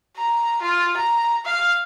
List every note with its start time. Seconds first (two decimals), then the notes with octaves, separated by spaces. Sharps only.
0.17 A#5
0.62 F4
0.97 A#5
1.46 F5